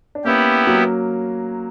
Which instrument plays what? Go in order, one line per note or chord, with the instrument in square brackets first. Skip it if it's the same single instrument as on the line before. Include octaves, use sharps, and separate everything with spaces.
[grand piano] D4
[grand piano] A#3 C#4 [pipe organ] B3 E4 G4
[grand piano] F#3 A#3